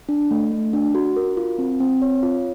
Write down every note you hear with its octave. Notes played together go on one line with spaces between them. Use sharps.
D4
A3
A3
D4
F#4
A#4
F4
C4
C4
C#5
F4